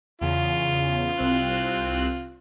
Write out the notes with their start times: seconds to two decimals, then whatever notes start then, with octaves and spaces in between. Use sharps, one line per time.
0.21 E2 C#3 F4
1.17 C2 C4 F#6